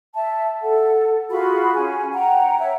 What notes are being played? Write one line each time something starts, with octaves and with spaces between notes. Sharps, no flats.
E5 A5
A4 F#5
F4 F#4 G#4 B5
C#4 G#5
F#5 G5 A#5
C#5 E5